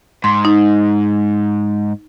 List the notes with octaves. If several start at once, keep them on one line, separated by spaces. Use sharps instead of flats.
G#2 C6
D#4